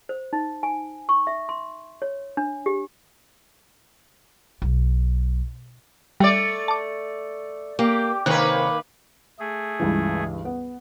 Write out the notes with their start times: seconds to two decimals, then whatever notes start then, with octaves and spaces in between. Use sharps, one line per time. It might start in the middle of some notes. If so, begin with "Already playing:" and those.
0.09 C5
0.33 D#4
0.63 G#5
1.09 C#6
1.27 E5
1.49 C6
2.02 C#5
2.37 D4
2.66 G4
4.62 B1
6.20 G3 A3 D5
6.68 A5 D6
7.79 A#3 G4
8.26 G#2 C3 D#3 A#3 B4 C#5 F#6
9.39 A3 G#4
9.80 C#2 G2 E3
10.45 B3